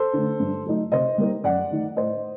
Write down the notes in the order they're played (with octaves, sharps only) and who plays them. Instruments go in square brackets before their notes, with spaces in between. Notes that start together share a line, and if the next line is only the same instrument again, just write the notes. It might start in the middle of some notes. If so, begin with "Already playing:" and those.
Already playing: [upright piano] A4 C5
D3 A3
G2
F#3 A3 D#4
C3 C5 D#5
G3 A#3 D#4
F#2 D5 F#5
D#3 A3 D#4
A2 C5 D#5